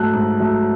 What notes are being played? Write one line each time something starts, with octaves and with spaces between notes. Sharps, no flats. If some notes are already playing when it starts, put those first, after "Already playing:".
Already playing: G#2 F#3 A3 F#6
G#2
F#3 A3